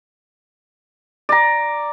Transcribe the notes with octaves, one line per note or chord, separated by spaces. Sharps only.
D5 A#5